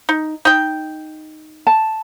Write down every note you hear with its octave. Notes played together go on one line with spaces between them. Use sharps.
D#4
D#4 G5
A5